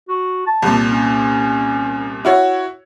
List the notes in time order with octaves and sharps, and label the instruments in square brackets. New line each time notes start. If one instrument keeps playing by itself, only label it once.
[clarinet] F#4
A5
[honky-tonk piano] C2 A#2
[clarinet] C#4
[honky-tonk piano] E4 F#4 C#5